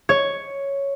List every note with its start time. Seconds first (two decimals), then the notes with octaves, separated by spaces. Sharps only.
0.09 C#5